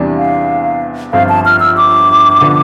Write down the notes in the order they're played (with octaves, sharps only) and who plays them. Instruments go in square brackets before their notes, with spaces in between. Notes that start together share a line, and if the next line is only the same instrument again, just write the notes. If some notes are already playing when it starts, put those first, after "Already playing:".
Already playing: [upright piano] E2 C3 E3 G3 D4
[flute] F5
[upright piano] G1 G2 F3 C4 F4 [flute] F5
[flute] A5
F6
E6
D6
[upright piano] D3 F3 B3